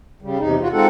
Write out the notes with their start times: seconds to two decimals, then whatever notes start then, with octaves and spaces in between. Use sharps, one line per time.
0.22 C#3 G3
0.39 E2 C3 D#4
0.61 C3 F4 F#4
0.72 G#3 C4 D#4 F4 A4 F#5